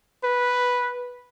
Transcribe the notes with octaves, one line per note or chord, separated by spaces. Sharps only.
B4